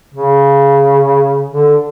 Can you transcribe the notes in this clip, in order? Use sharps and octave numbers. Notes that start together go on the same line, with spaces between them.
C#3
D3